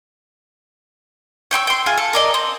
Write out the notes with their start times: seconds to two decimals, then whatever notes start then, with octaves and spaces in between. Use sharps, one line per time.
1.51 C#5 G5 C6 E6
1.67 G5 C6
1.86 F4 G#4 E5
1.98 A4
2.13 A#4 D5 D#5
2.34 C4